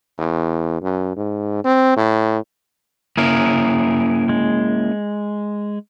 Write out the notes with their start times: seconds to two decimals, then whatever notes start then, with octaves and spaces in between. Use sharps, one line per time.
0.18 E2
0.82 F#2
1.16 G#2
1.64 C4
1.97 A2
3.17 A#3 C#4 E4 G#4 A#4
4.29 G#3